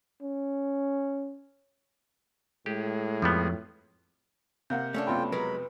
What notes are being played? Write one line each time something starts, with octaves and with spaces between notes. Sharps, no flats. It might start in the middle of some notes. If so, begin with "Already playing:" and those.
C#4
A2 G#3 G4
F2 F3 G3 B3
C3 A#3 F5 F#5 G6
A3 C#4 D4 C#5
B1 F2 C3 F4 G5 B5
F#3 G#3 A#4 B4 B5